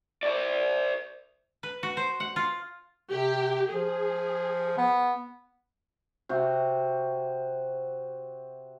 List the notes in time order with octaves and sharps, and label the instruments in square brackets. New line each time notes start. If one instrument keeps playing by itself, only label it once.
[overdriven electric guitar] C5 D5
[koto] B4
F#4
C5
F#5
F4
[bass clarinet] C3 [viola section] G4
[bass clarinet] F3 [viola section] G#4
[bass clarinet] B3
[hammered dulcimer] C3 F#4